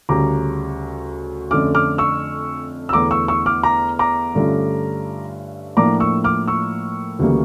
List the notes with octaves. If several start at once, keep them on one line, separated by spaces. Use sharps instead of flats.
D2 C#3 G3 C#4 A#5 D6
F2 D3 A3 C#4 D6 F6
D6 F6
C#6 E6
E6
E2 D3 A3 E4 A#5 D6
C#6 E6
C#6 E6
D6 F6
A#5 D6
A#5 D6
G2 D3 A3 C#4 F4
A2 F3 A#3 D4 F4 A#5 D6
C#6 E6
D6 F6
C#6 E6
D2 C#3 E3 G3 A#3